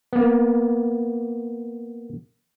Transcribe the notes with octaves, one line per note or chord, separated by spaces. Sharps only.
A#3 B3